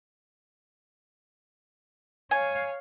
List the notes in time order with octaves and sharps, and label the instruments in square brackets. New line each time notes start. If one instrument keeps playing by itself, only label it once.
[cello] C#5 F5 [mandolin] G#5